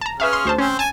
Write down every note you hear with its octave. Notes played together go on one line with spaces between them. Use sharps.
A5 A#5
C#4 G#4 B4 E5 F5 F6
C6
D2 C5 A5
C4 C#4 C5
G#5 A5